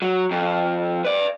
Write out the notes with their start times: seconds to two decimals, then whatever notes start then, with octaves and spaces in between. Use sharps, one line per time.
0.02 F#3
0.31 F2
1.05 B4 D5